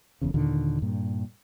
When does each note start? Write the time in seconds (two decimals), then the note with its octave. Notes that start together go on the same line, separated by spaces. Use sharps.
0.21 F#1 E2 C#3
0.34 D#2 A#2 D3 D#3
0.82 G2 A#2